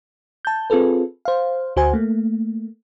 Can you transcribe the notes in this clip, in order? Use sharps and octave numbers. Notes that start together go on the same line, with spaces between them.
A5 G6
C4 F4 G#4 A4 B4
C5 F5
D2 F#4 C5 G#5
A3 A#3